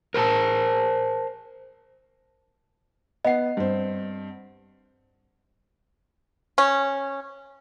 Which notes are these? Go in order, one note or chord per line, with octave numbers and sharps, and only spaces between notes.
A#4 C5 G5 A5
B3 D#5 F#5 C7
G2 C4
C#4